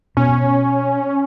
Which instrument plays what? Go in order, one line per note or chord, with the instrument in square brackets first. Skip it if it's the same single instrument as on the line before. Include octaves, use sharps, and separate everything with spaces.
[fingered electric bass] B2 [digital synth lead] C#4